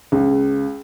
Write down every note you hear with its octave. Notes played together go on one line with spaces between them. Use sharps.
C#2